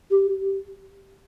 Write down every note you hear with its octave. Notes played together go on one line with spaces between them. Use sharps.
G4